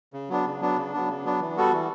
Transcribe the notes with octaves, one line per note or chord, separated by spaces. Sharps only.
C#3
F#3 B3 D4
C#3
F#3 B3 D4
C#3
F#3 B3 D4
C#3
F#3 B3 D4
E3
G3 B3 F#4 A4
E3